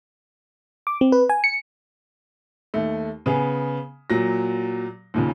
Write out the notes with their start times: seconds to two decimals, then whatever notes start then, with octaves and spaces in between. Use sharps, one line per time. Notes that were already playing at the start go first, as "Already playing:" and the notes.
0.87 D6
1.01 C4
1.12 B4
1.30 G#5
1.44 C#7
2.74 D#2 A3
3.26 C#3 B3 G#4
4.10 A#2 F#3 A#6
5.14 D#2 A#2 C#3